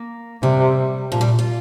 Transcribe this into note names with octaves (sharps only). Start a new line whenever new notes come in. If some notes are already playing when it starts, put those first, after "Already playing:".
Already playing: A#3
C3 G3
A#2 F3
G3
F4